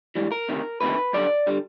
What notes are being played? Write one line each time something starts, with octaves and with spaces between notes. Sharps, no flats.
G#2 E3 G3
A#4
D2 C3 D#3
D2 C3 D#3 B4
F#2 D3 G3 D5
D3 G3